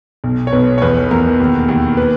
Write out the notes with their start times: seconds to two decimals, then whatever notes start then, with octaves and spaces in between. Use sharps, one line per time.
0.24 B1
0.47 C#5
0.53 B1 B4
0.78 C#5
0.82 E2 B4
1.11 E2 A#4
1.40 D#2
1.68 D#2
1.97 B4